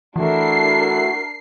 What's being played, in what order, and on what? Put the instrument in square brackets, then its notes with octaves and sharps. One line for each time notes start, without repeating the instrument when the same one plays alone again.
[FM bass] E3 [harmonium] A3 E4 F#4 [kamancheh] D4 A#4 [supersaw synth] C7